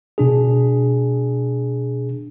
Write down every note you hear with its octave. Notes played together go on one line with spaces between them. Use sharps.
B2 D4 G#4